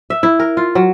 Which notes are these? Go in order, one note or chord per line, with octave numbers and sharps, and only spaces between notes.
E5
E4
A#4
F4
F#3